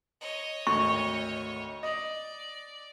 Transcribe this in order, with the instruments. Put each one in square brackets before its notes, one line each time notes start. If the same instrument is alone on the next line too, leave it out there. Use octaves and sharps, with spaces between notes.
[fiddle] C#5 D#5
[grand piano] G#1 D2 [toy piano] C#6
[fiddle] D5 [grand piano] D#5